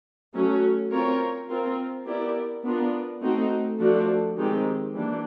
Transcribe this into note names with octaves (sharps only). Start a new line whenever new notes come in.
F#3 A3 C#4
C4 F4 A#4 C#5
C4 F4 A#4
B3 E4 G4 A#4 D5
B3 D4 F4 A#4
A3 C4 D#4 F#4
F3 A3 D4 F#4 A4
D#3 G#3 C4 D#4 G4
E3 G3 A#3 D4